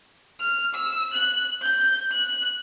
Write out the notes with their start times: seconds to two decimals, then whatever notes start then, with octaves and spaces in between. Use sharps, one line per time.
0.41 F6
0.75 E6
1.14 F#6
1.63 G6
2.12 F#6